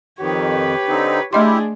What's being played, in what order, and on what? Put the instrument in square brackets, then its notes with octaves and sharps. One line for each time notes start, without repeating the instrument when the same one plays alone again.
[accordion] F2 D#3 [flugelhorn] G4 [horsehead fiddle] B4 C#5
[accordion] D3 C4 D#4
[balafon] A3 D#5 C6 [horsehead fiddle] D4 G#4 [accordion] E4 G4